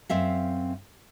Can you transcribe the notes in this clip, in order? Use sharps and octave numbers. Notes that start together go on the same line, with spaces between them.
F#2 C4 E5 F5